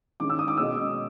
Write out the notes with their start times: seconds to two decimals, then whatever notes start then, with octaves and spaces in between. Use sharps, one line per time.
0.20 D#3 G#3 C#4 D6
0.30 E6
0.39 D#6
0.48 D6
0.57 B2 G#3 C#4 E6